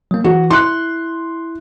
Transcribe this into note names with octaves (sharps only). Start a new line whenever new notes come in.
F#3 A#3
E3 F#4
E4 C6 F#6